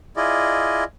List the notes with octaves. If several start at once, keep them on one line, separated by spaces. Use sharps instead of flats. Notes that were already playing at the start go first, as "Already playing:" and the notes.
E4 F4 G#4 D5 D#5